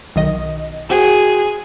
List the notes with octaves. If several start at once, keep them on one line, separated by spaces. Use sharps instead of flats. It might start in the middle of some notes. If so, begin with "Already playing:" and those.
B1 D#3 D#5
F#4 G#4 C5 G5